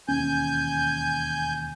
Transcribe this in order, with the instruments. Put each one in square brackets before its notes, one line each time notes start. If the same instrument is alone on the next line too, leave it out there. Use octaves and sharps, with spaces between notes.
[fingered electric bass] E1 D#2 C#4 [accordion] G#5 G6